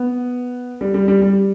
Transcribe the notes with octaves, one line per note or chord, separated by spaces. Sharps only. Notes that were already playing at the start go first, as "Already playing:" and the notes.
Already playing: B3
G3
G3
G3
G3